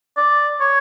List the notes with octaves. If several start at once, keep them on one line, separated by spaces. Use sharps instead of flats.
D5
C#5